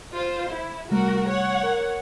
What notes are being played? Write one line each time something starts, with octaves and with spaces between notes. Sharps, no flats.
F4 C5
E4
C3 G3 A3 F#4 A#4
C#5 F#5
A#4